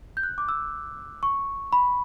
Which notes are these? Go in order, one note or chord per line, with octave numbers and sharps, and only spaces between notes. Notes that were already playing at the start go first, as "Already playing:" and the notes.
G6
F#6
D6
E6
C#6
B5